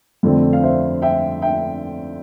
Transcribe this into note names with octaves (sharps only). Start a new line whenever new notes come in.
F2 D3 A3 C4
F5
C5 E5
E5 G5
E5 G5